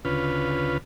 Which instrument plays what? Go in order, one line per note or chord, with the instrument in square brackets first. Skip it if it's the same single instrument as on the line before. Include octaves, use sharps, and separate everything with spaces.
[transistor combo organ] D2 C#3 F4 B4